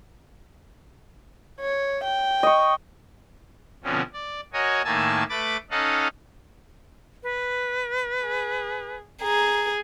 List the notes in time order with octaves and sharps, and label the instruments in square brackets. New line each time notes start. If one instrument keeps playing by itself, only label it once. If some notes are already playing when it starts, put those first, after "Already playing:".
[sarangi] C#5
G5
[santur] D#5 C#6
[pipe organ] B2 D3 F3 C4 C#4
D5
F#4 A#4 C#5 D#5 G#5
A2 D#3 A#3 G#5 A5 E6
A3 B4 B5 D6 A6
C#4 D#4 A4 D#5 F5 F#5
[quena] B4
[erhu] G#4
[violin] G#4 [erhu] A#5